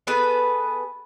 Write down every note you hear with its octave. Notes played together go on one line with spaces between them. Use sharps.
B3 G#4 A4 B4